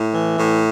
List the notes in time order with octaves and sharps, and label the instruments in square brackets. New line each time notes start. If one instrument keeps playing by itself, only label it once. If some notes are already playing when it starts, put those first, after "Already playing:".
Already playing: [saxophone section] A2
E3
A2